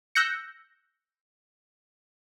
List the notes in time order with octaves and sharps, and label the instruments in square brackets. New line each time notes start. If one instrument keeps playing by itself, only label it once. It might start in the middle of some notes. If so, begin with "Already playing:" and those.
[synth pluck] E6 F#6 G6 A#6 C#7